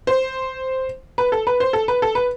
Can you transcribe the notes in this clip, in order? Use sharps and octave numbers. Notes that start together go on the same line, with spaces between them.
C5
B4
A4
B4
C5
A4
B4
A4
B4